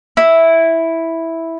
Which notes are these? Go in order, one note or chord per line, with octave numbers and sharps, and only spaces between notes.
E4